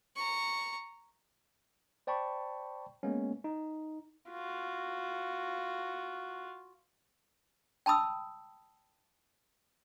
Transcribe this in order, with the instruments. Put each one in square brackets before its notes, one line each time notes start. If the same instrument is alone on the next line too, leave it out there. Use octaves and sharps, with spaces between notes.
[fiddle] A#5 C#6
[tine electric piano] C5 D5 G5 A5 B5 C#6
G#3 A#3 B3 C#4
D#4
[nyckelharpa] F4 F#4
[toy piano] G5 A5 B5 D#6 E6